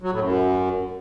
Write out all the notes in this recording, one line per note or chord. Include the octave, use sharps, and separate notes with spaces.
F#3
A2
F#2